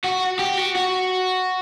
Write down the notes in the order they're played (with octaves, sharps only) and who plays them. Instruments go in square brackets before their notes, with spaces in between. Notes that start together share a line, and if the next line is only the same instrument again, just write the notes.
[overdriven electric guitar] F#4
G4
F#4
F#4